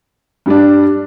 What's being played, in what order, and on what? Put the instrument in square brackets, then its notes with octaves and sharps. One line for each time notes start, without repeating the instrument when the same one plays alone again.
[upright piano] G2 G3 D4